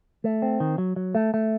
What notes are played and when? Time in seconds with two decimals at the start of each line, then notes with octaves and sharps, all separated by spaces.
0.24 A3
0.42 C4
0.60 D#3
0.78 F#3
0.96 F#3
1.15 A3
1.34 A3